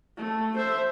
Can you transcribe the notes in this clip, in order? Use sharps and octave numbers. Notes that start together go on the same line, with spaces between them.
A3
C5 E5